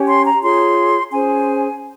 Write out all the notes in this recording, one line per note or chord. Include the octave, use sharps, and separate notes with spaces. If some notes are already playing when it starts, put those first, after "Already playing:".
Already playing: C#4 G4 C#5
C6
A#5
F4 G#4 C#5 C6
C#4 G#4 C5 G#5